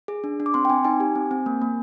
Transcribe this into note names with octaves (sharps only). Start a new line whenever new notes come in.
G#4
D4
D4
D6
C4 C6
G5
C4 G#5
D#4 G#5
G4
C4
C4
A#3
A#3